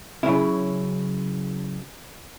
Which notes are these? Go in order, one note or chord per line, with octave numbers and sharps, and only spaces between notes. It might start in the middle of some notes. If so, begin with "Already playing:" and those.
C#3 F#3 C#4 E4